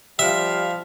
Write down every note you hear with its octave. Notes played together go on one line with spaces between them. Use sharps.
F3 G3 E5 F5